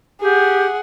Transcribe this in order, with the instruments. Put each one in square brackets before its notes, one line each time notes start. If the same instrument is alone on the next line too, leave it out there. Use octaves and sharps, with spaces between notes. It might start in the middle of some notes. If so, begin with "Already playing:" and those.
[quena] G4 [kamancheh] G#4 F#5